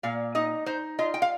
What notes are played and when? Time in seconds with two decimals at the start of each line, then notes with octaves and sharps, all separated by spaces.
0.03 A#2 F5
0.35 D#4 D#5
0.66 D#4 C5
0.99 F4 D#5
1.14 G5
1.22 F5